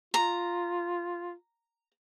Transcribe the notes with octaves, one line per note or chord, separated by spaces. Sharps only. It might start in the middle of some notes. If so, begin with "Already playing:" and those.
F4 A#5